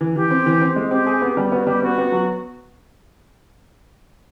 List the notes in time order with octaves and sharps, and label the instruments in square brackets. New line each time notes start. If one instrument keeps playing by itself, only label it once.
[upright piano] E3
[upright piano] E3 [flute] G4
[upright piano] C4
E3
C4
G#3
[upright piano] C4 [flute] G4
[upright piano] G#4
B3
G3
[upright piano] B3 [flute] F#4
[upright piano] G3 [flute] G4
[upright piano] B3 [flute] F#4
[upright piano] B3
F#3